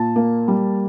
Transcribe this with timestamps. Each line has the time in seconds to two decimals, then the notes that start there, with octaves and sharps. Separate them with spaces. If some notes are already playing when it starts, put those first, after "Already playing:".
Already playing: A#2 A5
0.16 A#3
0.48 G3